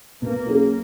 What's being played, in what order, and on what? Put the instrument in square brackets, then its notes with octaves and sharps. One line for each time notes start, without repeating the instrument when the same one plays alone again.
[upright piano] B2 [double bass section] A#3
[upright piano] F#3 C#4 G#4